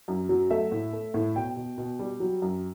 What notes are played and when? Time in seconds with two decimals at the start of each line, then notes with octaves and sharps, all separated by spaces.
0.08 F#2
0.29 F#3
0.51 A3 E5
0.72 A2
0.93 A3
1.14 A2
1.35 B2 G5
1.57 B2
1.78 B2
1.99 G3
2.20 F#3
2.42 F#2